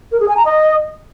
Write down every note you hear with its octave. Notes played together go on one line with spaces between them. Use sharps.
A#4
G#4
G#5
A#5
D#5